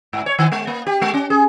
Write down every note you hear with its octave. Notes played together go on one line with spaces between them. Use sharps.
G#2
C#5
D#3
G#3
A#3
G4
G#3
C#4
G#4